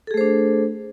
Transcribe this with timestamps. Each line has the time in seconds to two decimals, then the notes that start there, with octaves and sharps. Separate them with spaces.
0.07 A4
0.11 G#4
0.14 A3
0.17 C5
0.21 D4